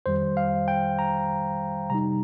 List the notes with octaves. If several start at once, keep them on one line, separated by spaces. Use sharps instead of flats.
F2 D#3 G3 C5
F5
G5
A#5
C3 G3 D#4 A#5